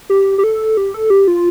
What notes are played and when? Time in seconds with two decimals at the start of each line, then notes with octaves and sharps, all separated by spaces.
0.10 G4
0.38 G4
0.44 A4
0.77 G4
0.94 A4
1.10 G4
1.28 F4